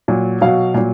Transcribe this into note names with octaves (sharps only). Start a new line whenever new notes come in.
A#2 F#3
B2 F#3 F5
A#2 F#3